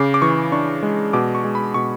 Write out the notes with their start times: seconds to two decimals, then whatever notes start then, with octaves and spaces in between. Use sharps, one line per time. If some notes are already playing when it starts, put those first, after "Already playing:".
Already playing: C#3 D6
0.14 D6
0.22 E3 C#6
0.52 D4 C#6
0.83 G#3
1.13 B2 D6
1.35 C#6
1.44 G#3
1.55 B5
1.74 B2 C#6